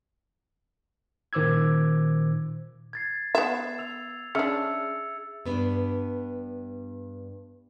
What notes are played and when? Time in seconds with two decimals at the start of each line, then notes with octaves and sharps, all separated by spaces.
1.33 A#2 D#3 C5 D6 E6 G#6
2.93 G#6 A6 C7
3.35 B3 E5
3.79 E6 F7
4.35 C#4 D4 G#4 E5 E6 C#7
5.45 G2 B3 D4